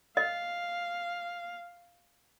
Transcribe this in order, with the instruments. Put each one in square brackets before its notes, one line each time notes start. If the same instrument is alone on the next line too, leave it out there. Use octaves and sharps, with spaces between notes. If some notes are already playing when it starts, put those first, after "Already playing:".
[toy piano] D#5 [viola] F5